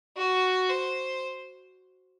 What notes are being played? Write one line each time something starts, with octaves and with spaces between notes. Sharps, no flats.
F#4
C5